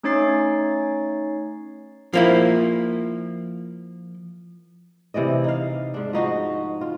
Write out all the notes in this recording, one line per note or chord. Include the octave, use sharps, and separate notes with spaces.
A3 C#4 D#4 C#5 A6 C7
F3 A#3 E4
C3 E3 D5 D#5
D#4 F5
G#2 D4
F3 D#4 F#4
F4